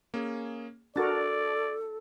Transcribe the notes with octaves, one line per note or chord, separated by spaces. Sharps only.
A#3 C#4 G#4
D4 F#4 A4 A#4 D5 A5 A6